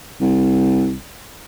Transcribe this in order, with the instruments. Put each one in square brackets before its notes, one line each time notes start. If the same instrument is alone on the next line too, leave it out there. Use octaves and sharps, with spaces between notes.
[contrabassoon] C2